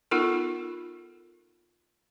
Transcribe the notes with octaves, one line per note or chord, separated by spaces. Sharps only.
B3 D#4 F4 A4 A#4